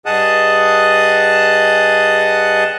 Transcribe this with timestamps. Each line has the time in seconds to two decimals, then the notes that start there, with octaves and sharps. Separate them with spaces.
0.06 G2 G#4 D#5 F#5 A5 D#6